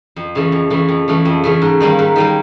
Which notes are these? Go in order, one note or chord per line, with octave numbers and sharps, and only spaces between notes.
F2
C#3 E3 A3
F2
C#3 E3 A3
F2
C#3 E3 A3
F2
C#3 E3 A3
G#2
D#3 G3 A#3
G#2
D#3 G3 A#3